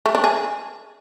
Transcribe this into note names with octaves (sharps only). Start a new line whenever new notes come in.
A3
D4
G#4